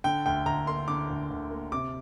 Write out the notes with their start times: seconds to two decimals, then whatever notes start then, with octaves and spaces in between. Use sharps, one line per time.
0.04 D3 G5
0.26 D2 G5
0.46 D2 A#5
0.67 A#3 C6
0.88 D3 D6
1.10 D2
1.31 D2
1.51 A#3
1.72 C3 D6